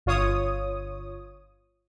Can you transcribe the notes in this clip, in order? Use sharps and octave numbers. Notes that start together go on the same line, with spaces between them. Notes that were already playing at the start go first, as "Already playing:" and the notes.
G1 F4 C#5 D#6